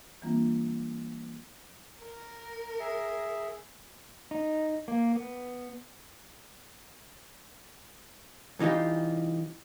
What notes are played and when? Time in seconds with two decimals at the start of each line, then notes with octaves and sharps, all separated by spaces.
0.22 E3 G3 A#3 C4 D4 F4
2.02 A#4
2.80 G#4 E5
4.31 D#4
4.88 A#3
5.16 B3
8.59 C2 E3 D#4 F4 G4